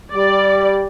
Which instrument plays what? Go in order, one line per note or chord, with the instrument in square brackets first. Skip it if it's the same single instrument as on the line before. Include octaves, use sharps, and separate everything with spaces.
[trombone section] G3 [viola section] D5